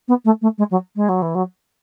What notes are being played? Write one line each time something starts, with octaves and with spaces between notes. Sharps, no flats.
B3
A3
A3
G#3
F#3
G#3
F#3
E3
F#3